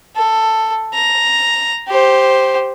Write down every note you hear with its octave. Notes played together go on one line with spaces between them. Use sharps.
A4
A#5
G4 C5